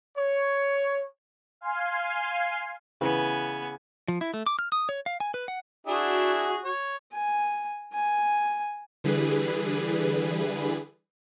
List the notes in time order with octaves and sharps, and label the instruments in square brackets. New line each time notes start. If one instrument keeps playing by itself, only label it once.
[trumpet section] C#5
[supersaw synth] F5 G#5 C6
[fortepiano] C#3 E3 [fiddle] B3 G#5
[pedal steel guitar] F3
E4
A3
D6
F6
D#6
C#5
F5
G#5
B4
F#5
[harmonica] D4 E4 G#4 [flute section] F#4
[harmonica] C#5
[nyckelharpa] G#5
G#5
[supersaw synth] D3 E3 G3 G#4 B4